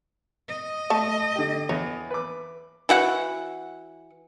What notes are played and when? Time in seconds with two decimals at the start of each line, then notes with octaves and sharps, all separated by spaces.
0.49 D#5
0.90 A3 A5
1.36 D3 G4
1.69 E2 C#5
2.10 B4 D6
2.89 E3 F#4 F#5